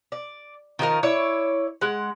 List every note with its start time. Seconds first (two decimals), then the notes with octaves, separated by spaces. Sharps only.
0.12 D5
0.79 D#3 F3 D#4 A#4
1.03 E4 C#5 D5
1.81 G#3 F#5